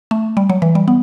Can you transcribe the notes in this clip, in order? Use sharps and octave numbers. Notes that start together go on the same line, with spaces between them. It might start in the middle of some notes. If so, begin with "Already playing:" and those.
A3
G3
F#3
E3
G3
B3